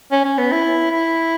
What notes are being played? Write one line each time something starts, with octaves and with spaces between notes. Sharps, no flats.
C#4
C#4
B3
E4
E4